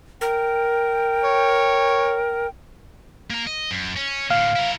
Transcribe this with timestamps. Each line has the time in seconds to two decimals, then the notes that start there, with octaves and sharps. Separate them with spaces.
0.21 A#4 G5
1.25 C#5
3.30 A#3 A#5
3.47 D#5
3.71 F#2
3.96 C#4
4.31 A2 D3 F5
4.56 E4 A#4